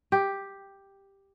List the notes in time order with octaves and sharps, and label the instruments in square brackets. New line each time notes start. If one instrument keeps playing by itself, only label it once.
[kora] G4